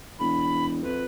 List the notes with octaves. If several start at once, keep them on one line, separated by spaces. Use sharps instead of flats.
E1 B5
F2 B4